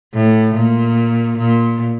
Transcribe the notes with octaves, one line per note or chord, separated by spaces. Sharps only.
A2
A#2
A#2